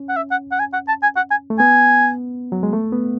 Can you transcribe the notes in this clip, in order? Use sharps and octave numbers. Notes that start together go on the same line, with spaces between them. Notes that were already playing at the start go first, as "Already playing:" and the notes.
Already playing: C#4
F#5
E5
F#5
F#5
G#5
F#5
A5
G#5
F#5
G#5
A3
B3 G#5
F#3
G#3
A3
B3